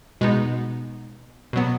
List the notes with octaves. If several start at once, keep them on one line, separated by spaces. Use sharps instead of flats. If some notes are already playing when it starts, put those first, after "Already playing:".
B2 G#3 B3 D#4
B2 F#3 B3